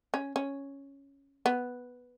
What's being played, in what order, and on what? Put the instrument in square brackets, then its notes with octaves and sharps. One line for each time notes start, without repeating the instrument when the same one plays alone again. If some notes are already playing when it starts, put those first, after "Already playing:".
[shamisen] C#4
C#4
B3